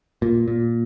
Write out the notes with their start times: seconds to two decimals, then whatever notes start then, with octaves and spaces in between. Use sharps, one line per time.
0.22 A#2
0.48 A#2